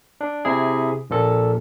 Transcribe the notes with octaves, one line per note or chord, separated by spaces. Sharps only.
D4
C3 E4 G#4
A#1 A#2 A4